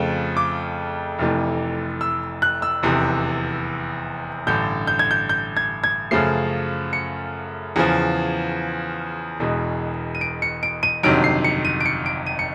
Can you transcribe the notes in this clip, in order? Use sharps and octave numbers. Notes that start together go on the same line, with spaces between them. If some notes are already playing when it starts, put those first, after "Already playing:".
Already playing: F2 C#3 F3 A3
D6
F1 F2 C3 E3 A3
E6
F#6
E6
F1 E2 C3
A1 G2 D3 G6
G6
G#6
G6
G6
G#6
G#6
F#2 C#3 F3 A3 C7
C#7
E2 C#3 F3
E1 E2 B2 G#3
D#7
D7
C#7
D7
D#7
G1 F2 C3 D#3 F#3 D7
C7
C#7
D#7
D7
C#7
D7
D#7
C#7